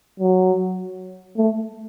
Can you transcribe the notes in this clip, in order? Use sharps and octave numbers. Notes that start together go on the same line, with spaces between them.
F#3
A3